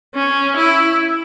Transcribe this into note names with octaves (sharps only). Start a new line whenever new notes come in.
C#4
E4